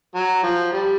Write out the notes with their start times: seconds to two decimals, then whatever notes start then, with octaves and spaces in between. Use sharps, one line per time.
0.15 F#3
0.43 F3
0.72 G3